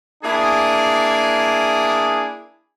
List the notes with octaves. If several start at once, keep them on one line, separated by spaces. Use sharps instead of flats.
A#3 D4 E4 G#4